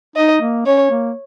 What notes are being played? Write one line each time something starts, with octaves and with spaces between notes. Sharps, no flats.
D#4 D#5
A#3
C#4 C#5
A#3